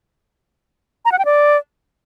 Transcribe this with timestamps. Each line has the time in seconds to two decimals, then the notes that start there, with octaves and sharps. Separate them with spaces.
1.05 A#5
1.12 F#5
1.19 G5
1.25 D5